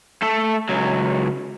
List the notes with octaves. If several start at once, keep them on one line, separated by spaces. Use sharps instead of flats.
A3 A4
C#2 F#3